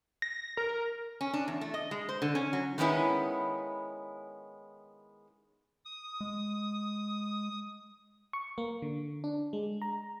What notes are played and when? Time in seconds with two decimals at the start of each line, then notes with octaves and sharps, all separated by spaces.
0.22 A#6
0.57 A#4
1.21 C#4
1.34 D4
1.48 E2
1.61 A3
1.74 D#5
1.91 G#3
2.09 C5
2.22 D3
2.35 C#4
2.53 F#3
2.78 D#3 G#3 B3 C#4 E4
5.85 D#6
6.21 G#3
8.33 C#6
8.58 A#3
8.82 D3
9.24 D4
9.53 G#3
9.82 A#5